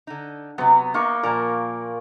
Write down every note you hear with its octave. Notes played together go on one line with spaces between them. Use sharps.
D3 D#4
C3 F#3 B3
A#3 D#4 C#6
A#2 F3 A#4